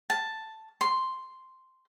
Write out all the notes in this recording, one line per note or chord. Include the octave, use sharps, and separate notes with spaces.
A5
C6